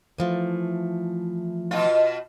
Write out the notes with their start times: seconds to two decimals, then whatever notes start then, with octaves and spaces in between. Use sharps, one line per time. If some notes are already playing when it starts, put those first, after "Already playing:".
0.18 E3 F3 A3
1.71 B2 F4